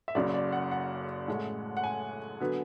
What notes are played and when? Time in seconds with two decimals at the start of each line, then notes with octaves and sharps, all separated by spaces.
0.08 E5
0.15 F#1 F#2 C#3 D5
0.34 D5
0.52 F#5
0.71 F#5
1.28 A1 A2 G#3
1.77 F#5
1.84 G#5
2.40 D3 F#3 B3